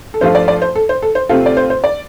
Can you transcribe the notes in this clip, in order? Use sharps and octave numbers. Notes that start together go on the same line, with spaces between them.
A4
G2 F3 A3 F4 C5
D5
D5
C5
A4
C5
A4
C5
C3 A3 C4 F4 A4
D5
C5
C5
D5